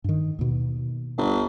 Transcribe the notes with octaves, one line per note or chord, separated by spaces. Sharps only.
G2 D#3
D#2 B2
G1